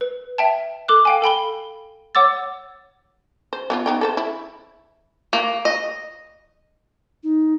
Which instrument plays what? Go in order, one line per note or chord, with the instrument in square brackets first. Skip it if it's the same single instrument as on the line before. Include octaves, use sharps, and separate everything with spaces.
[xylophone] B4
E5 G5 A5
A4 D6 F#6
F5 G5 G#5
A4 G5 B5 G7
C#5 F#5 D6 E6 A6
[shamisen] C5
B3 C#4 F4
B3 D#4 G5
A4 B4 C5
E4
[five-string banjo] A#3
D#5
[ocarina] D#4